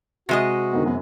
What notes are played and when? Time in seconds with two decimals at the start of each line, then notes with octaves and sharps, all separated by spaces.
0.29 C3 G#3 F#4 D#5
0.73 D3 D#3 B3
0.86 F#2 B3